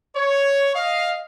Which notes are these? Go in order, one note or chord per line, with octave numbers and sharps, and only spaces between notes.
C#5
D#5 F5